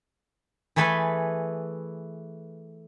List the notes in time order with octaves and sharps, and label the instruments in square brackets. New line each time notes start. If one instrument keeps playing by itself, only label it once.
[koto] E3 A3 G#4 A4 B4 G#5